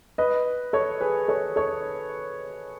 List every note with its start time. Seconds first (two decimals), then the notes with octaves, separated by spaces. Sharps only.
0.18 B4 D#5
0.73 A4 C#5
1.01 G#4 B4
1.28 A4 C#5
1.56 A4 C#5